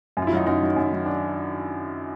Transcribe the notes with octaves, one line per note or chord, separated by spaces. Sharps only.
F#2
F4
E4
D#3 F#3 D#4
F#2 D#4
D#3 F#3
F#2
D#3 F#3
D4